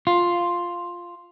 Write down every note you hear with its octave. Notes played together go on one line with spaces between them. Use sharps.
F4